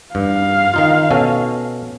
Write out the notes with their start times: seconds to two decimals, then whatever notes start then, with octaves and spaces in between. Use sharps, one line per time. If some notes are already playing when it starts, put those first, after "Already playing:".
0.15 G2 F5
0.74 D#3 D#4 F4
1.11 B2 C#4 A4